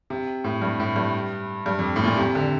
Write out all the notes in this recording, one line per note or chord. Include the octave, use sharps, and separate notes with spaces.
C3
A2
G2
A2
G2
G2
F2
A2
A#2
C3
D3